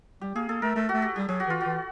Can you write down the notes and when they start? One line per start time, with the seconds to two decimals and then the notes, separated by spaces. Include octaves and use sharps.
0.21 G3 G4
0.35 A#3 G#4
0.49 A#3 A4
0.62 A3 A#4
0.76 A3 A4
0.89 A3 F#4
1.02 G4
1.16 G3 G4
1.29 F#3 G4
1.40 F#4
1.47 E3 F4
1.61 E3 F#4